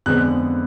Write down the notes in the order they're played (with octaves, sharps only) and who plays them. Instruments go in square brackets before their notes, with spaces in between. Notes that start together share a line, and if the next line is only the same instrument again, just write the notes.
[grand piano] F2 D3 G#3 B3 F#6